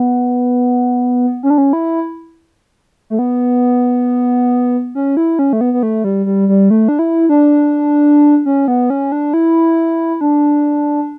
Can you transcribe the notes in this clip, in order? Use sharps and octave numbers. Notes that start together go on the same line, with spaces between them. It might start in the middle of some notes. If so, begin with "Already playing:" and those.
Already playing: B3
C#4
D4
C#4
E4
A3
B3
C#4
E4
C#4
A3
B3
B3
A3
G3
G3
G3
A3
D4
E4
D4
C#4
B3
C#4
D4
E4
D4